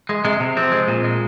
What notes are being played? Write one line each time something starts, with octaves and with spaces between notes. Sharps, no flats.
G#3
C3 G#3
C3
F3 C4
G#3
A#2
G#3